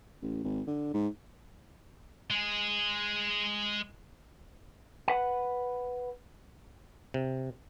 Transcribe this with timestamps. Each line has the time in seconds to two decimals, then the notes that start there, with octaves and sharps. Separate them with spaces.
0.22 A1
0.44 G#1
0.67 D3
0.93 G#2
2.30 G#3 G#4
5.08 B4 F#5
7.14 C3